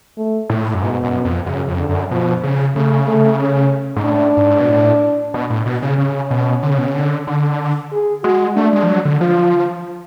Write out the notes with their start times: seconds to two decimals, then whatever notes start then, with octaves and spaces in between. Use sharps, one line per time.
0.17 A3
0.50 A2
0.74 F#2
0.82 G#2 B2
1.04 F#2
1.25 F2
1.46 F#2 C#3
1.68 F2
1.78 D3
1.89 F#2
2.11 B2 F3
2.43 C#3
2.75 C#3 A3
3.07 A3
3.40 C#4
3.96 G#2
4.05 A2 D4
4.37 G#2
4.60 B2
4.69 A2
5.34 B2
5.50 A2
5.66 B2
5.82 C#3
5.98 C#3 C#4
6.31 B2
6.63 D3
6.70 C#3
6.78 B2
6.86 C#3
6.95 D3
7.27 D3
7.92 G#4
8.24 G#3 F#4
8.56 A3 D4
8.73 G#3
8.83 F3
8.88 F#3
9.05 D3
9.21 F3 F4